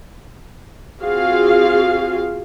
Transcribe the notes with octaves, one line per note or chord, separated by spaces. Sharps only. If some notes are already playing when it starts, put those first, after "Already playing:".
C4 F4 F#4 G#4 F5